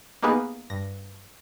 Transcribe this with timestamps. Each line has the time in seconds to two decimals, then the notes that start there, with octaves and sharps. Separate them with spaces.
0.22 A#3 B3 D#4 G4 G#4 B4
0.70 G2 A#6